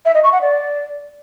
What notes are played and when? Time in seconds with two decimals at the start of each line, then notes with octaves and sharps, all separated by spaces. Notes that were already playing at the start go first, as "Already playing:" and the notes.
0.05 E5
0.15 D#5
0.24 C#6
0.33 F#5
0.42 D5